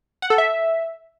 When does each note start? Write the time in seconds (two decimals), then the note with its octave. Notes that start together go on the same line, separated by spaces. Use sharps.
0.22 F#5
0.30 A4
0.38 E5